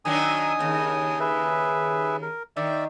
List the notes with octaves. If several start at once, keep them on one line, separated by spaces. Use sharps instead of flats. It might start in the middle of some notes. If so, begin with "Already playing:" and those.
D#3 F#3 D4 G#5 D#6
D#2 C#3
G#4 B4 E5
A#4
D#3 D5 E5